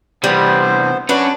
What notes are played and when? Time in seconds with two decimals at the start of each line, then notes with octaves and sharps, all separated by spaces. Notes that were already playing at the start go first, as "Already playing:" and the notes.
0.24 C3 E3 G3 B3 C5
1.09 C#4 D4 F#4 B4